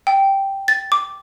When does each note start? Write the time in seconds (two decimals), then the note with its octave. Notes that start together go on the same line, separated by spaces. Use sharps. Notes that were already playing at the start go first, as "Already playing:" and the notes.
0.07 G5
0.68 A6
0.92 D6